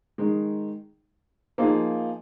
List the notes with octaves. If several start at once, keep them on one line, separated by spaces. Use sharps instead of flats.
D#3 G#3 D#4
F3 A#3 D#4 G#4